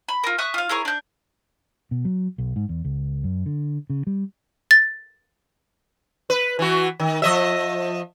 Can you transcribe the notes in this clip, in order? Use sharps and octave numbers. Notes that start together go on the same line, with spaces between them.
B5
F4 A#4
E5 C#6 D#6 F#6
F4 F5
E4 G#4 A#4 C#5
D4 G6
B2
F#3
B1
G#2
E2
C#2
F#2
D3
C#3
G3
A6
B4
E3 F#4
D#3
F3 D#5 E5